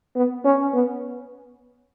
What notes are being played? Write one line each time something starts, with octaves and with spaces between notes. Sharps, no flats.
B3
C#4
B3